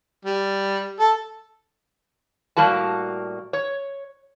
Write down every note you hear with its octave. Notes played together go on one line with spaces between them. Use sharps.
G3
A4
A2 G3 A#3 F#4 A5
C#5